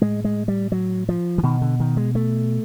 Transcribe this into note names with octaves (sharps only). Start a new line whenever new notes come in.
A2 G#3
G#3
G3
F#3
F3
E3
B2 D#3
D3
D#3
G#3
A3